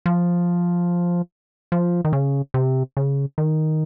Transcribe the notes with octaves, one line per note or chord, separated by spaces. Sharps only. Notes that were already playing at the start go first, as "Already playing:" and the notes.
F3
F3
D#3
C#3
C3
C#3
D#3